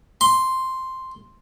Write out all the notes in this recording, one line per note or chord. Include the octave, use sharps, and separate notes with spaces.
C6